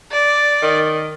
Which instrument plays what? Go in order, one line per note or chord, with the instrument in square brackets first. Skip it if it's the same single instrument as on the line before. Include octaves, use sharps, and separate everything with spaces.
[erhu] D5
[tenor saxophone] D#3